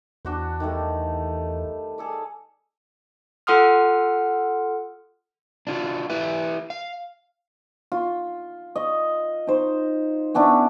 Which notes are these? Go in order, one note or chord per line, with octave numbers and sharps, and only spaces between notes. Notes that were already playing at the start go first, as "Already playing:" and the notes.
E2 D4 F#4 C5
D#3 G3 A3
G#4 A4 D5
F4 A4 F#5 C6 D#6 F6
D4 F4 F#4
E4 G4 B4 E5
F5
F4
D#5
D#4 C5
B3 C#4 D4 E4